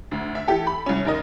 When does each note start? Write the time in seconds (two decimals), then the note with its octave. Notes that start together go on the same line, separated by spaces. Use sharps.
0.11 D2
0.35 E5
0.48 E3 G4 A4
0.67 B5
0.86 C2 C#4
1.05 D#2 A#4 D#5